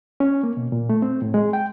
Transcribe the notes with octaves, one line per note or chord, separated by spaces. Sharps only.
C#4
A#3
B2
A#2
A3
C4
A2
G#3
G5